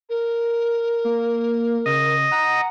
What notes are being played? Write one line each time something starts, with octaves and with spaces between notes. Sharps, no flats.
A#4
A#3
C#3 D#5
F#5 A#5